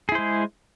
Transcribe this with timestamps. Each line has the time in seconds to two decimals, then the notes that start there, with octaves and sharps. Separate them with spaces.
0.09 G#4
0.12 E4
0.15 C5
0.18 G#3